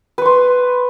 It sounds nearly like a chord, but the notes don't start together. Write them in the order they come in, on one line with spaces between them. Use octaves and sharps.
B4 C#6 C6